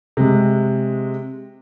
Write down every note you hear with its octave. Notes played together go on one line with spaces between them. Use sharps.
C3 G#3